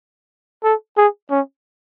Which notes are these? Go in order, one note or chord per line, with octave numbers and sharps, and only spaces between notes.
A4
G#4
C#4